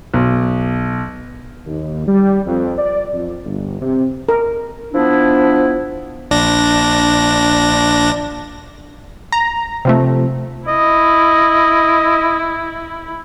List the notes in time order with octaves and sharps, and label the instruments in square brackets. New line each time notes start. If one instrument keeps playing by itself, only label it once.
[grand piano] B1
[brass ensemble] D#2
G3
F2
D5
F2
G1
C3
[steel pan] A#4
[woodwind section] F3 B3 D4 E4
[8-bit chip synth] A#1 D4 A#6
[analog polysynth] A#5
C3 F3 A3
[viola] E4 [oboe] D#5